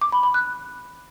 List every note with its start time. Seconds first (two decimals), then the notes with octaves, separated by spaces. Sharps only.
0.02 D6
0.12 B5
0.23 B5
0.34 F#6